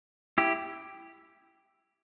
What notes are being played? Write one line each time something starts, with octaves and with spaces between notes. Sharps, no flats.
E4 G4